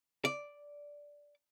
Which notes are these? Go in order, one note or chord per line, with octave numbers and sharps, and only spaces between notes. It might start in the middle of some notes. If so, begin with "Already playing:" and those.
D5